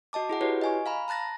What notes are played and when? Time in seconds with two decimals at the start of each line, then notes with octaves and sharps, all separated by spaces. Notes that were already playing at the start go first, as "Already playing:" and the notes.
0.13 F#4 D#5 A5 D6
0.29 E4 G#4 F#5
0.41 E4 F#4 G4 B4 C#5
0.61 D#5 G#5 C#6
0.86 F5 A#5 B5
1.08 A5 A#5 F#6 A6 A#6